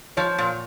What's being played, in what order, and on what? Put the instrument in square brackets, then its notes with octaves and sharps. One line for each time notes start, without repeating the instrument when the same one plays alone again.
[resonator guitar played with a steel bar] F3 [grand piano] C#5
[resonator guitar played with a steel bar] A#2